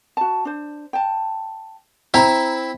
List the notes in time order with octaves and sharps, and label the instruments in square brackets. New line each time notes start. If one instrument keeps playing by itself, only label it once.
[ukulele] F#4 A5
D4 C5
G5 A5
[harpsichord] C4 E4 [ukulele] C5 A#5 B5